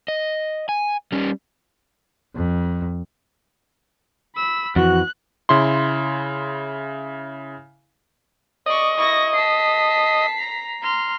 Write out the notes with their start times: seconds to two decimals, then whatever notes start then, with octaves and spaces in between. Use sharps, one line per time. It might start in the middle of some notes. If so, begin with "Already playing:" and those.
0.08 D#5
0.69 G#5
1.12 G3 C#4
2.36 F2
4.36 B5 E6
4.76 F2 E3 F#4 F#6
5.49 C#3 E4 C6
8.66 D5 D#5 C#6
8.97 E4 C#6 A#6
9.34 A5 B6 C7
10.38 A#5
10.81 A#5 C6 F6